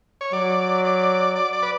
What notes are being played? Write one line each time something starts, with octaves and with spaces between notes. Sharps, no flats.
C#5
F#3 D5
D5
D5
D5
B4